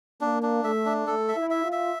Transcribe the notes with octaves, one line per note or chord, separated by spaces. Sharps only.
A#3 D4
D4
A3 E5
D4
A3 A4
E5
E4
E5
F4
E5